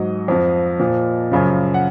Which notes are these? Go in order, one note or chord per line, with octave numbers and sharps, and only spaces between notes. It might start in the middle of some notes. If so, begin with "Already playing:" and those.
Already playing: G#2 F#3 D#5
F2 F3
A#2 F3
F#2 C#3 F3
F#5